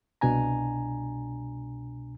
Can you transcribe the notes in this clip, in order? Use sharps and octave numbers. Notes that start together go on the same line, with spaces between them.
C2 B2 D4 G#5 A#5